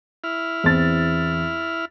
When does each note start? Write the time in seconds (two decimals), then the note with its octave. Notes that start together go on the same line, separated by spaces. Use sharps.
0.24 E4 F6
0.64 E2 C4 A6